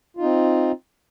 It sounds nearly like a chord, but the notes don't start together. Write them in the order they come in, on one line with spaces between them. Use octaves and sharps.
F4 D#4 C4